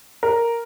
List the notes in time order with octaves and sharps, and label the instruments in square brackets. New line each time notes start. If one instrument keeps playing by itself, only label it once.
[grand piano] A#4